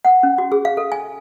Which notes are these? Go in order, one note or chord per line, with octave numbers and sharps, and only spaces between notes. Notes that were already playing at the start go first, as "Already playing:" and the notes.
F#5
C#4
F#4
G#4
F5
A4
G#5